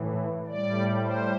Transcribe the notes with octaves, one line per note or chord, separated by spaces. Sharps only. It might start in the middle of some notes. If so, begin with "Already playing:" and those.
Already playing: A2 E3
A2 G3 D5
C5